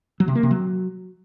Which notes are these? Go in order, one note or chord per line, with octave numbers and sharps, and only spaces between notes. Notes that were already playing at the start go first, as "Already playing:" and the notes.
F#3
C3
A#3
C3
F#3